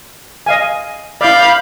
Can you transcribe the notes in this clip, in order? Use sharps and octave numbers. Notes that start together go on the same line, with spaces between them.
D#5 F5 G#5
E4 D5 F5 B5 G6